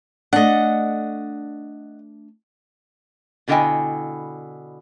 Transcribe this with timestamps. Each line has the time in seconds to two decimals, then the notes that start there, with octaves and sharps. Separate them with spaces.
0.33 A3 D4 D#5 F#5
3.48 B2 D3 E4 D#5 G5 G#5